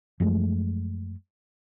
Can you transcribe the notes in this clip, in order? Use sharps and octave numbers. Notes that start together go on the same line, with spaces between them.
F#2 F3 G#3 A3